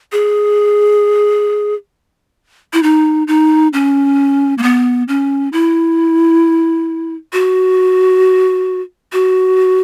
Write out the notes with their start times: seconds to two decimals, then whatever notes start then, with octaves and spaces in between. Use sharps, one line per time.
0.12 G#4
2.73 E4
2.83 D#4
3.28 D#4
3.73 C#4
4.58 A#3
4.63 B3
5.08 C#4
5.53 E4
7.33 F#4
9.13 F#4